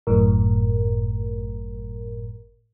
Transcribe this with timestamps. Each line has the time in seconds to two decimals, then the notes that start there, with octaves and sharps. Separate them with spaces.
0.07 G1 F#2 A2 A#4